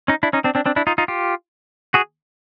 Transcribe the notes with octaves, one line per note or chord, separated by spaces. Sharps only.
C#4 D#4
D4 E4
C#4 D#4
C4 D4
C4 D4
C4 D4
D4 E4
D#4 F4
D#4 F4
F4 G4
F#4 G#4